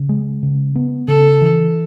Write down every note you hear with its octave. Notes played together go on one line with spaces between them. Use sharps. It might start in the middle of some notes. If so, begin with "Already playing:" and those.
Already playing: C#3
G#3
C#3
B3
C#3 A4
E3